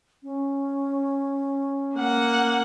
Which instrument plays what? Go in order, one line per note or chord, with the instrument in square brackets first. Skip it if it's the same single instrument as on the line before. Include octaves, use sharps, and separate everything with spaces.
[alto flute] C#4
[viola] A#3 F#5